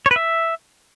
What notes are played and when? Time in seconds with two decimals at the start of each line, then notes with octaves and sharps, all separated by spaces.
0.06 C#5
0.11 B4
0.16 E5